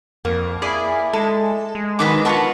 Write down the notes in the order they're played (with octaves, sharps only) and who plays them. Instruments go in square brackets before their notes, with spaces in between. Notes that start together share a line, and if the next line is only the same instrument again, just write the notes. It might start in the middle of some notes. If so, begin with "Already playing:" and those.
[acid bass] F2 [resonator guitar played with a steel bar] A#3
[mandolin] E4 D5 [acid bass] G#4
[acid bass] G#3 [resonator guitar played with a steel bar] A4
[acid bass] G#3
[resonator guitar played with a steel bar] B2 D#3 F#3 [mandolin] B4 D#5 D6
[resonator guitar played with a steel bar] B3 D#4 F4 [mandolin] A#4 A5 C#6